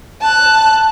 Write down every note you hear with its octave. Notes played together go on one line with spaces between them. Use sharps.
A5 F#6